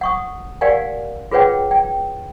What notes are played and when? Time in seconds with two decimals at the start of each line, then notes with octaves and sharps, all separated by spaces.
0.01 F#5 C#6 D#6
0.61 G4 A#4 D5 F5 F#5 G#5
1.31 F4 G#4 B4 C#5 F#5 G5
1.71 G5